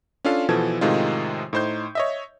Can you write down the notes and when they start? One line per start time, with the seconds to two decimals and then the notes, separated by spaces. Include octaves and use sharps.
0.25 C#4 D4 F4 A4 F5
0.49 B2 E3 F3 A4 G#6
0.81 A2 C3 D#3 G#3 D#4 F4
1.53 A2 D#4 C5 C6 G6
1.95 C#5 D#5 E5